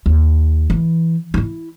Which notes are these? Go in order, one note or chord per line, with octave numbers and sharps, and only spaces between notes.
D#2
E3
D#4 E4